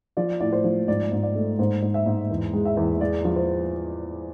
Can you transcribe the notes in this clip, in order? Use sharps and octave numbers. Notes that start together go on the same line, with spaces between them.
F3 D5
A2 D5
C5
F3
G#2 D5
G#2
D5
A3
G#2 C5
G#2
E5
G#2
E2
G#3
E5
E2
G#3 D5
F3
C5